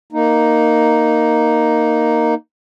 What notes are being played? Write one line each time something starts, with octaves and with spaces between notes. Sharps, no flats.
A#3 D#4